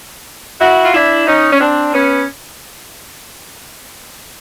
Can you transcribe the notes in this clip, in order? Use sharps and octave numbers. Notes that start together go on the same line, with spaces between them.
E4 F#4
F4
D4 E4
C#4 D#4
C#4
C4 D4
B3 C#4